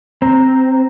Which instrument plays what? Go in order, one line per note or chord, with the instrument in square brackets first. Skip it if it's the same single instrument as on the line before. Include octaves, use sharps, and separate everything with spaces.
[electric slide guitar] C4 [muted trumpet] A#5